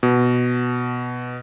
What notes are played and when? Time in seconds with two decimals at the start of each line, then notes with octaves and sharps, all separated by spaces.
0.03 B2